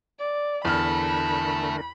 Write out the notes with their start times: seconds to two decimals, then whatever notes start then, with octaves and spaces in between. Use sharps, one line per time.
0.19 D5
0.65 E2 D3 A3 A4 A#4 B5 F6